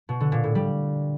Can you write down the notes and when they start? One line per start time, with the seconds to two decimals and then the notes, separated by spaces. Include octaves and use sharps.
0.09 B2
0.20 D3
0.32 A#2
0.44 A2
0.55 G3